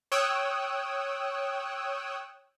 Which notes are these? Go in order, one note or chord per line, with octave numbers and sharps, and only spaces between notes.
C#5 G5 D#6 E6 F#6